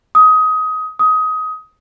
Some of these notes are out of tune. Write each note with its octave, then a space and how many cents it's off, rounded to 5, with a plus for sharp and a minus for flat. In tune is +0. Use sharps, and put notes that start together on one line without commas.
D#6 +20
D#6 +20